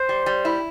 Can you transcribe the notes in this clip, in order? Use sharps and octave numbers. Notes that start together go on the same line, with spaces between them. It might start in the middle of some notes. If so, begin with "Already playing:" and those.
Already playing: C5
G3
G3
E4